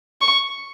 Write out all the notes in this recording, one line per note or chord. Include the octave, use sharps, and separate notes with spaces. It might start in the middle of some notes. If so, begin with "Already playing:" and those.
C#6